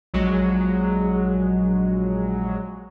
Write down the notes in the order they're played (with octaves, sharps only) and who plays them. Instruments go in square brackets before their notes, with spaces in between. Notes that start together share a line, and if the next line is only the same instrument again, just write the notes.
[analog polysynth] A#1 F#3 G#3